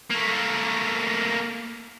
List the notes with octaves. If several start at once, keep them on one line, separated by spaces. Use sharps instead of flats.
A3 A#3